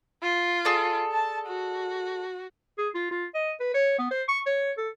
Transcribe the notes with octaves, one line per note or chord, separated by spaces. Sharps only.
F4
G#4 A4 D5
A5
F#4
G#4
F4
F4
D#5
B4
C#5
B3
C5
C#6
C#5
A4